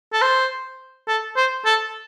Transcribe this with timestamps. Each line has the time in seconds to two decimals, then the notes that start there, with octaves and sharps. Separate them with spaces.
0.13 A4
0.22 C5
1.08 A4
1.37 C5
1.66 A4